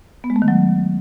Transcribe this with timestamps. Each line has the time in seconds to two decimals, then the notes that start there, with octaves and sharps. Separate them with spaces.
0.24 B3
0.30 G#3
0.36 A3
0.42 D#3
0.48 F#3